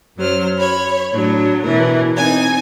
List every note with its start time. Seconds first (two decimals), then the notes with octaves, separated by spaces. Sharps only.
0.18 F#2 F#3 C5 F6
0.58 C#5 B5
1.14 A2 F#3 D4
1.63 B2 E3 A#4
2.17 C4 D#4 G#5 G#6